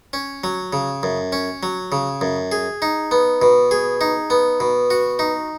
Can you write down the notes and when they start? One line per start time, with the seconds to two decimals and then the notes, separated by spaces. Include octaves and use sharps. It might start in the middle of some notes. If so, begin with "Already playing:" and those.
0.13 C#4
0.44 F#3
0.73 C#3
1.03 F#2
1.32 C#4
1.63 F#3
1.92 C#3
2.21 F#2
2.52 G#4
2.82 D#4
3.11 B3
3.42 B2
3.71 G#4
4.01 D#4
4.30 B3
4.60 B2
4.90 F#4
5.19 D#4